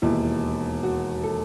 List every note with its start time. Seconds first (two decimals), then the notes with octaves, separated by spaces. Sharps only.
0.02 E1 D#2 D#3 E4
0.83 F#4
1.24 A4